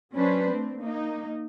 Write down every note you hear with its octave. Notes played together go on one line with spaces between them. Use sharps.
F#3 C#4 D4 B4 C5
A3 C4
A#3 D#4